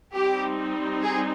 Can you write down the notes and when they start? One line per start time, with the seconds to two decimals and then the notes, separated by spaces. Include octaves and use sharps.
0.14 G3 C4 D#4 G4
1.03 G#4